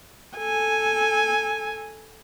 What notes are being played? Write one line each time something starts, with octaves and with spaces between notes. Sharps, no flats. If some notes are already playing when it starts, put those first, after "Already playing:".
A4 G#5